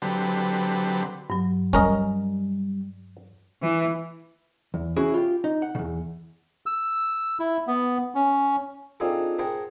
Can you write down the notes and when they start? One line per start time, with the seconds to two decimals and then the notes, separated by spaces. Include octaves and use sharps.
0.02 D3 F#3 C4 G4 A4 B4
1.30 G2 F#3
1.73 G3 C#4 A#4 D#5
3.61 E3
4.74 E2
4.96 C#4 E4 F#4 G#4
5.14 F4 G4
5.44 D#4
5.62 F#5
5.75 E2 C#3
6.66 E6
7.39 E4
7.67 B3
8.15 C#4
9.00 C4 D4 D#4 F4 G#4 A4
9.39 G#4 A#4 C5 F#5 G5 A5